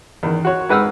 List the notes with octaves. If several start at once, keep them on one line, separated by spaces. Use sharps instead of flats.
E2 D#3
F#4 C#5
G#2 B4 F#5 E6 F6